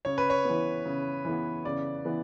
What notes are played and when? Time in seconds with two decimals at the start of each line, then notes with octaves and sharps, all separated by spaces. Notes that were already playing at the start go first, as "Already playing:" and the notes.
0.05 C#3 C#5
0.18 B4
0.30 C#5
0.45 E3 B3
0.86 C#3
1.25 E3 B3
1.65 C#3 D5
2.05 E3 B3